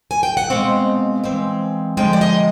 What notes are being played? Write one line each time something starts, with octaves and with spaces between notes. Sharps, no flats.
G#5
G5
F#5
B2 G#3 C4 F5
E3 G#3 C4
D3 F3 G#3 G5
D5
D#5